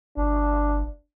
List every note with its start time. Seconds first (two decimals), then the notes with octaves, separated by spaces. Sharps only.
0.17 G1 D4